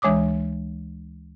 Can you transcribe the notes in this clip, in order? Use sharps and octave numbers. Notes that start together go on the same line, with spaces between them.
D2 E3 G#3 C#5 D6 D#6